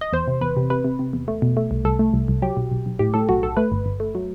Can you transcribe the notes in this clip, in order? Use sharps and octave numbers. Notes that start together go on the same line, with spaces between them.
D#5
E2 C5
C3
E2 B4
C3
C3 B4
C3
C3
E2
A3
B2
A3
C2
C2 A4
A3
C2
C2
F#3 G4
B1
B1
B1
A2 G4
A2 A4
B1 F#4
B1 A4
A3 B4
G1
G1
A3
F#3